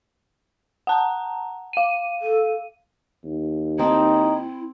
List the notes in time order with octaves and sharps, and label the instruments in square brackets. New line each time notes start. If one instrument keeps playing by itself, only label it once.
[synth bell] F#5 A5 A#5
F5 D#7
[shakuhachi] A4
[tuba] D#2
[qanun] C4 A5 [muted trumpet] D#4 [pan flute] E4